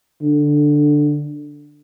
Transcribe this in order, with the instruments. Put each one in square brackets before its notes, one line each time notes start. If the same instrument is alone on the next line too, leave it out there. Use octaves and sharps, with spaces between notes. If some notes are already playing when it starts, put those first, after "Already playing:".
[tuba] D3